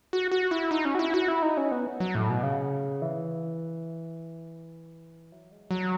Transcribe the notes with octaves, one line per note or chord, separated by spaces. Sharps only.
F#4
F#4
E4
D#4
C#4
F#4
E4
F#4
E4
D#4
C#4
B3
F#3
A2
B2
C#3
E3
F#3
G#3
F#3